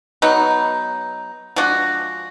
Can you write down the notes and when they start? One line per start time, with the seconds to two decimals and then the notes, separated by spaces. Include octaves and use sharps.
0.22 F#3 B3 D#4
1.56 F3 G#3 D4 F#4